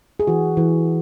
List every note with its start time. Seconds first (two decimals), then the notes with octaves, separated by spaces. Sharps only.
0.20 G#4
0.27 E3 F#4
0.57 E3